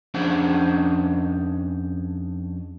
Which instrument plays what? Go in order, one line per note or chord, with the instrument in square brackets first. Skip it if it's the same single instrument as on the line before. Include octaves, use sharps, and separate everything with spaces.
[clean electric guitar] F2 C#4 D4 G#4 C5 F#5